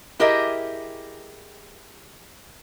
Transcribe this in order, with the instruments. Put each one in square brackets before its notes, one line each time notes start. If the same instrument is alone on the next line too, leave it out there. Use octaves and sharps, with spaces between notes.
[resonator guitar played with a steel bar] E4 G4 G#4 A#4 D#5 E5